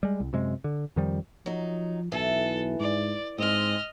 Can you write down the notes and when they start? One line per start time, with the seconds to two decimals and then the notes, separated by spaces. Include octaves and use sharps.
0.03 G3 G#3
0.20 C2
0.33 F#2 C3 G#3
0.64 D3
0.96 F2 D#3 F3 G3
1.46 F3 F#3 D#4
2.12 B1 E3 A4
2.80 G#2 D5
3.38 G#2 G#3 C4 D#5 F6